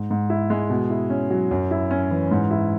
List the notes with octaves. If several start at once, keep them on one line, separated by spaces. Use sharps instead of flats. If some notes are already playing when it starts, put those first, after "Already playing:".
Already playing: G#2
G#2
E4
G#3
B2
E4
C#4
F#3
F#2
E4
C#4
E3
G#2
E4